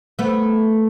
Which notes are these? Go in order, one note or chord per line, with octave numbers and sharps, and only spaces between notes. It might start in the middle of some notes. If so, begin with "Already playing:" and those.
A3 B3